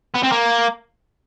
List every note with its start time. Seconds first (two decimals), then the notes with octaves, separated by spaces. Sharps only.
0.15 B3
0.24 C4
0.32 A#3